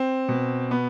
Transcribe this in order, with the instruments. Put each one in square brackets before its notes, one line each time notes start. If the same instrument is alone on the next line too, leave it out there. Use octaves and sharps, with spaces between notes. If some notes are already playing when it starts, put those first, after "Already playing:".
Already playing: [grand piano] C4
B2
B3